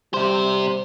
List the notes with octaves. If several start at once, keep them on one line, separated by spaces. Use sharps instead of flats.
C3 G3 C5